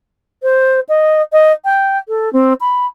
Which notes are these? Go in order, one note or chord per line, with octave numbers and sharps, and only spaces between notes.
C5
D#5
D#5
G5
A4
C4
B5